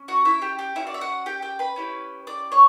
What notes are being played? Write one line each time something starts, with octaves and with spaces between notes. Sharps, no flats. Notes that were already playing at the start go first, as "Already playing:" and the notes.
Already playing: C#4
F#4 F#5
E4 E5
G4 G5
G4 G5
C#4 E4 F#4 E5
D5
E5
F#4 F#5
G4 G5
G4 G5
B4 B5
C#4 E4 G4
D5 D6
C#5 C#6